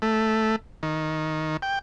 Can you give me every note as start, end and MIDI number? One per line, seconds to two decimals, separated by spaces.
0.02 0.56 57
0.83 1.57 51
1.62 1.79 79